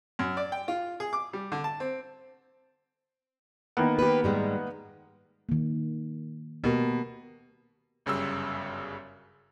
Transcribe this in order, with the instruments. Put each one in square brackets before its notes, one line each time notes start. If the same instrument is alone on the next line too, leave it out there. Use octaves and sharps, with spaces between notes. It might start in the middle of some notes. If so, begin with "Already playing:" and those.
[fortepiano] F#2
D5
G5
F4
G#4
D6
G3
D3
A5
C4
[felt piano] D#3 A#3 B3
[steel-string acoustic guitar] G4 B4
G#2 G3 G#3
[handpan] D#3 A#3
[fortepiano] B2 [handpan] A#3 G4 A#4
[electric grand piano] G1 F#2 C#3 G3 E6